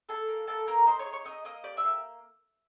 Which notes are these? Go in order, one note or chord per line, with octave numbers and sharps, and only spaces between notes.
G#4 A4 A5
A#3
A#3 A4 A5
A#3 A#4 A#5
D#4 C5 C6
C#5 C#6
G#4
C#5 C#6
D#4 D#5 D#6
A#3 D#5 D#6
G4 D5 D6
E5 E6
A#3